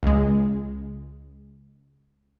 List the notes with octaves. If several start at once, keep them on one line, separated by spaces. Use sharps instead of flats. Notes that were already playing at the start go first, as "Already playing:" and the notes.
C#2 G#3